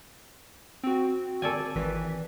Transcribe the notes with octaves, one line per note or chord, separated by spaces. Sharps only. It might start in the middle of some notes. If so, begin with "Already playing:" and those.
C4 F#4
A4 D5 G#5
G#1 E3 B6